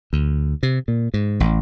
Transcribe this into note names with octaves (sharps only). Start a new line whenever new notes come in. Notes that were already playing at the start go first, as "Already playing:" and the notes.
D2
C3
A#2
G#2
A1